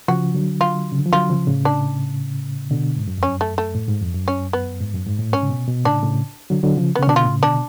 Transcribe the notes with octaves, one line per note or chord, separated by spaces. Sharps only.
C#3 F3 F#4
D3 F#3
F4
C#3
D3
F3
D3 F#3 F4
C#3 F3
A2 C#3
D4
B2 D3
G#2
F#2
F2 C#4
F#2
A3
A3
A2
G#2
F2
F#2
C#4
B3
G#2
F#2
G#2
A2
G#2 C#4
C#3
B2
B2
A2 C#3 D4
A2 C#3
D3 F#3
D3 F#3
C#3 F3
B3
C#3
C#4
B2 D3 D4
F4
A2 C#3
B2 D3 D4